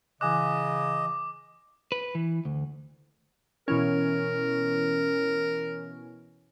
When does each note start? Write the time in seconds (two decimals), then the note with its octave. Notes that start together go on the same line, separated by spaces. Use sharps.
0.21 C#3 E3 D#5 G#5 D6 F#6
1.92 B4
2.15 E3
2.45 D2
3.68 B2 E3 C#4 A#4